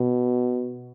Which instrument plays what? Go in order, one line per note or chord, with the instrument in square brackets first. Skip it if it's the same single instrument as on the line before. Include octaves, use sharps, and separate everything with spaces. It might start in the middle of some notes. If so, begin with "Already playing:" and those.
Already playing: [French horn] B2